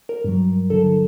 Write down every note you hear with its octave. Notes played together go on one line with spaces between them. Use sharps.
A#4
G2 F#3
D2 D3 F#3 A4